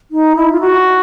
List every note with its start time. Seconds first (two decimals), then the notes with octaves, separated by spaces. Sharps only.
0.11 D#4
0.36 E4
0.52 F4
0.61 F#4